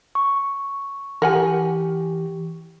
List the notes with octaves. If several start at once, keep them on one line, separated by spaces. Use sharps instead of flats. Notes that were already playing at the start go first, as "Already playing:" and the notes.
C#6
E3 G4 A#4 F#5 G#5